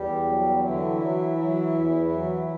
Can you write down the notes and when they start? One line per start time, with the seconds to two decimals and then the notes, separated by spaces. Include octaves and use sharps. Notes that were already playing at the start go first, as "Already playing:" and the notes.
Already playing: E2 G3 G4
0.25 F#3
0.63 D3 E3 E4
1.00 F#3
1.38 F#3
1.75 E2
2.12 F#3